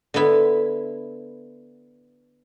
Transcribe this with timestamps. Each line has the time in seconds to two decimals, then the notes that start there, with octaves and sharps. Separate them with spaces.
0.14 D3 B3 E4